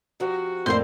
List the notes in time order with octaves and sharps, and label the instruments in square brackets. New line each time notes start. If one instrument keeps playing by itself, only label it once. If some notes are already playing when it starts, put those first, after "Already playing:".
[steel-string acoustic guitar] C3 F3 [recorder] F#4
[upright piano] F2 A2 G6 [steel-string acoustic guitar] A3 A#3 D5 [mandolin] C5 C6